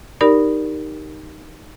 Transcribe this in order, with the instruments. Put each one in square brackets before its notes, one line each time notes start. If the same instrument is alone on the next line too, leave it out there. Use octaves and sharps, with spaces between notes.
[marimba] D#4 G4 A#4 D5 B5